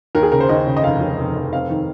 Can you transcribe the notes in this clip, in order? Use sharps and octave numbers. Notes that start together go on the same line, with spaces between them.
D#2 A#4
G#4
C#3 A#4
C5
D#2 D#5
C#3
D#5
F1 F5
D#2
F1
F1
C4 F5
D#3